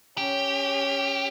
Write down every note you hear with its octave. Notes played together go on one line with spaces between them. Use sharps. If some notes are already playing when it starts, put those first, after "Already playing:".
C#4 G4